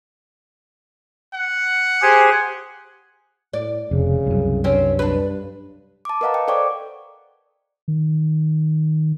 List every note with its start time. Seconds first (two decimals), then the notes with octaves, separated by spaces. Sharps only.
1.34 F#5
2.02 G4 G#4 C5 G#5
3.53 A2 D5
3.91 F1 C#3
4.26 C2 F#2
4.64 G2 C4 C#4
4.99 D4 B4
6.05 A5 D6
6.21 A#4 B4 D#5 F5 F#5 A#5
6.34 G5
6.48 A4 C5 D5 G5 C#6 D6
7.88 D#3